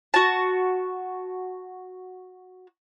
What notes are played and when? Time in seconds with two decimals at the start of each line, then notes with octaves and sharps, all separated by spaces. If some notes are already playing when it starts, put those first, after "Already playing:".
0.14 F#4 A5